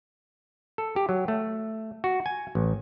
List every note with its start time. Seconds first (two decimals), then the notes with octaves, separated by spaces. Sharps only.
0.78 A4
0.96 G4
1.09 F#3
1.28 A3
2.04 F#4
2.26 G#5
2.55 A1